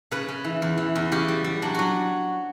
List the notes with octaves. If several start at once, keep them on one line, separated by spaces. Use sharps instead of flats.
C#3 B4
C#3
E3
E2
E3
E2
C#3 G4
G3
G3
F#3 D4
F#3 F#4